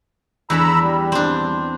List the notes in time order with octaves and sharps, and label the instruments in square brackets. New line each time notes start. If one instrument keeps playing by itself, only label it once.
[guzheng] E2 D4 A4 [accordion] A#5 B5 E6
[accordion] G3
[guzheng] C4 D4